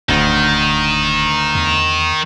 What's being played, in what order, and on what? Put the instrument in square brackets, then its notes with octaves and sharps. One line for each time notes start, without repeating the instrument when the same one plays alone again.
[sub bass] D#1 [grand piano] D2 [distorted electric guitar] D#3
[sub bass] E2